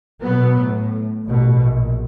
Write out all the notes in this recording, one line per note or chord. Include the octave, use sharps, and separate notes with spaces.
B2 F#3 B3
A2
A1 B2
A#1